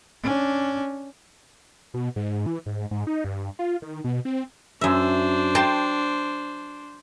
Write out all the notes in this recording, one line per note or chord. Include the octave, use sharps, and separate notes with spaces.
C#4 D4
B2
G#2
E3
G#2
G#2
D#4
G2
F4
D#3
B2
C4
F#2 D4 C5 E5
G5 A5 C6